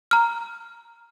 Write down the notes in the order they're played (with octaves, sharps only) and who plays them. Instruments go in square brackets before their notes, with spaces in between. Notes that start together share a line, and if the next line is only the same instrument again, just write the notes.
[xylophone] A#5 F6